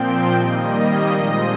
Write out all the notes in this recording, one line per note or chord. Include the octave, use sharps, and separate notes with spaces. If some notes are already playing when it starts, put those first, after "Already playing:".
Already playing: A#2 F3 C4 G5
D#3 G3 A#3 D#5
A#2 F3 G#3 C4